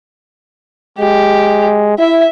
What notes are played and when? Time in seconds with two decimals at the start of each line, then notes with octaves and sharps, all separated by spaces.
0.99 G#3 G4
1.98 E4 E5